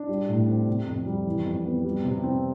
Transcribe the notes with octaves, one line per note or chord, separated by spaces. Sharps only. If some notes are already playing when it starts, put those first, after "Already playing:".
Already playing: D4
G3
A2
C4
C3
F2
G3
E3
F2
B3
G3
C3
C4